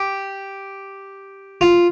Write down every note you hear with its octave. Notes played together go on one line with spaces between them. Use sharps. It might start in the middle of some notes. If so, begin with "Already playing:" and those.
Already playing: G4
F4